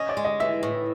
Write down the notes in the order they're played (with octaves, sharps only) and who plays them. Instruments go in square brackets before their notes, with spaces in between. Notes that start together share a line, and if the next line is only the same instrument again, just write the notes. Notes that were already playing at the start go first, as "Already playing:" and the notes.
Already playing: [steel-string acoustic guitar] C#4 [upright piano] D#5
[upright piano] D5
[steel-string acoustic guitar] G#3
[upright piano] D#5
[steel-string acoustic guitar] E3 [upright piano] E5
[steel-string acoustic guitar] A2